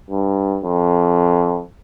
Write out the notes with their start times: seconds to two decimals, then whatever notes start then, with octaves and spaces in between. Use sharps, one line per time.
0.10 G2
0.64 F2